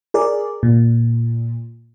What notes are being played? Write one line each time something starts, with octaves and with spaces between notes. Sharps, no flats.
G#4 A#4 D5
A#2